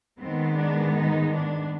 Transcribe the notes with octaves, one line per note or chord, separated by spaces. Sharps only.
G#2 D#3 G#3 B3 C4
D4
D#4
D4